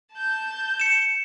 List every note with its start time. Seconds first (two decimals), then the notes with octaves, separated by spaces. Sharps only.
0.14 A5 G6
0.80 C#7 E7